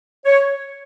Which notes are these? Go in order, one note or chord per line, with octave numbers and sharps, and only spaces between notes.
C#5